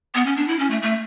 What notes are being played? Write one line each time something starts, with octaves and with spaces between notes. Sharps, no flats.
B3
C#4
D4
E4
C#4
A3
A3